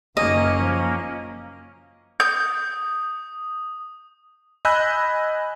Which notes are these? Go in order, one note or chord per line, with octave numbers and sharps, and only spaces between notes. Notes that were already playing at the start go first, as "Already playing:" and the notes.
F#1 D#3 A#3 C#4 D#5
F3
D#6 G6
D#5 G#5 B5 E6 F#6 G6